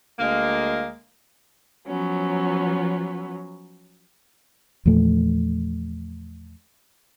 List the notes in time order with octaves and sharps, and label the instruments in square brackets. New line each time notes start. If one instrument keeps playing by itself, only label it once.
[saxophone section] D2 G#3 A#3
[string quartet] F3 F#3 B3 C#4
[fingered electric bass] E2 A#2 F3 A3